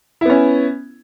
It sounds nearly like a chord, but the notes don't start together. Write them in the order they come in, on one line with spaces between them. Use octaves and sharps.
E4 B3 C#4